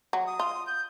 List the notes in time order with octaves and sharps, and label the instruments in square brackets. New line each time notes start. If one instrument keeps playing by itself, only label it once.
[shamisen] F#3
[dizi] D#6
[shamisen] F4
[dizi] G6